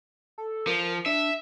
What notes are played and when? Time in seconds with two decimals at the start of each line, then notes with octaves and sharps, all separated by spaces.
0.38 A4
0.67 F3 A#4
1.06 D4 E5